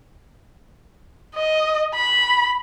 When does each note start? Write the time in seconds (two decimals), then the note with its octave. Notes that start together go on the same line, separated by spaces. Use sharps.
1.35 D#5
1.95 B5